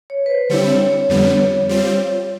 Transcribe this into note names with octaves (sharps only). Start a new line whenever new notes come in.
C#5
B4
C5
D3 G3 C4 E4 C#5
C#5
C#5
F2 D3 G3 B3 C#5
G3 C4 F4